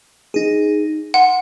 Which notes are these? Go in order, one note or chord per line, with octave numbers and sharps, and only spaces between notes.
D#4 G#4
F#5 C6